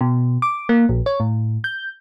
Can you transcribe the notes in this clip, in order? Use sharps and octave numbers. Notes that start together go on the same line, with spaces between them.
B2
D6
A#3
A#1
C#5
A2
G6